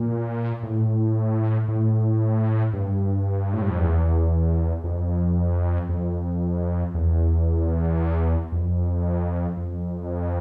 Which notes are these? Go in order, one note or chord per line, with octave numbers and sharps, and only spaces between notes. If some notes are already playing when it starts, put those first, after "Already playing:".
Already playing: A#2
A2
A2
G2
A2
G2
F2
E2
F2
F2
E2
F2
F2